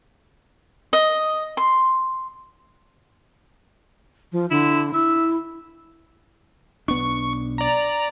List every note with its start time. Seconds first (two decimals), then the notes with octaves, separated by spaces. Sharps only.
0.93 D#5
1.57 C6
4.32 F3
4.50 D3 E4
4.94 E4 E5
6.88 B1 B3 D4 C#6
7.58 D5 A#5